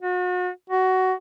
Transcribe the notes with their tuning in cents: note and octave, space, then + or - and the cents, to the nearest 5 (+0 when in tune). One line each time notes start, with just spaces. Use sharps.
F#4 -40
F#4 +15